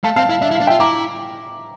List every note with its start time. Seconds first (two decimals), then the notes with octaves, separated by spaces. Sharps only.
0.04 A3 F5 A5
0.16 C4 F5 A5
0.29 E4 F5
0.41 D4 E5
0.51 E4
0.55 F5
0.61 D4
0.67 F4 E5 G5
0.80 E4 A#5 D6